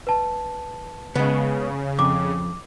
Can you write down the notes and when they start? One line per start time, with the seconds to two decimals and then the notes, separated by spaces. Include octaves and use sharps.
0.07 B4 A5
1.15 C#3 G#3 B3
1.99 F2 D6